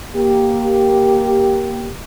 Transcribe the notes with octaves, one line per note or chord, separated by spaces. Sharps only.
A#3 G4